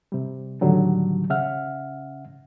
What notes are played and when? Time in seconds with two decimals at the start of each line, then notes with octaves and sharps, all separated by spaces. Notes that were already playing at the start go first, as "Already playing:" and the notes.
0.12 C3 G3
0.62 A2 D3 D#3 F#3 G3
1.30 C#3 C#4 E5 F#5 F6